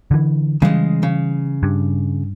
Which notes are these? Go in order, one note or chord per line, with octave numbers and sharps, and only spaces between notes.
D3 E3
C#3 E3 G3 G#3
C#3
G2